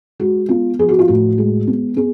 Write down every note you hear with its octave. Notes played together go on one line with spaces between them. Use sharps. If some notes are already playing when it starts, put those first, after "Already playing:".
G#3 F#4
B3 F4
F3 G#4
F#4
F4
A2 F#4
G#3
B3
B3 G#4